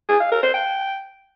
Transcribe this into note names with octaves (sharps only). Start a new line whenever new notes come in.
G#4
F5
A#4
C5
G5